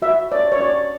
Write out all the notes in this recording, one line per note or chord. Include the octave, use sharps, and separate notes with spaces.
F#4 E5
C#5 D5
C#5
F#4 D5